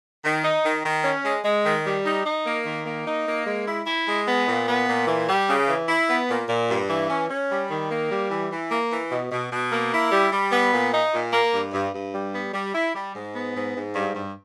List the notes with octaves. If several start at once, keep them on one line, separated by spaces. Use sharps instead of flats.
D#3
D#4
D#3
D#3
C#4
G#3
G#3
D#3
G3
D#4
D#4
A#3
D#3
A#3
D#4
A#3
G#3
E4
E4
G#3
B3
A#2
B3
A#2
E3
G3
C#3
E3
E4
B3
A#2
A#2
G2
E3
C#4
C#4
G3
D#3
A#3
G3
E3
E3
A#3
E3
B2
B2
B2
A#3
E4
G3
G3
B3
A#2
D#4
A#2
A#3
G2
G2
G2
G3
B3
G3
E4
G3
G#2
B3
G#2
G#2
G2
G2